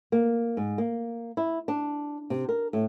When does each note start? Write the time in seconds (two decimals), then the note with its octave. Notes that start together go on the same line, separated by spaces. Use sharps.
0.12 A#3
0.57 G#2
0.78 A#3
1.37 E4
1.68 D4
2.30 C3
2.49 A#4
2.73 A2